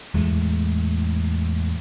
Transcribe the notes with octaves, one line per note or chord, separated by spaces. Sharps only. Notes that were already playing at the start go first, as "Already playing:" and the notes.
E2 A2 G#3 A3